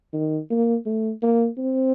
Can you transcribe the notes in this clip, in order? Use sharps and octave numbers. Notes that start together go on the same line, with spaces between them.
D#3
A#3
A3
A#3
C4